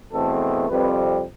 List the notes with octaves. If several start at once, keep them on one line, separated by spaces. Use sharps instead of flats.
E2 B2 A3 C4 A4
F2 C3 G3 C4 B4